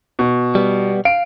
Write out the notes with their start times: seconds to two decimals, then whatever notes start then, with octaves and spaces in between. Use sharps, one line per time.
0.19 B2
0.55 G3 B3
1.05 F5 D7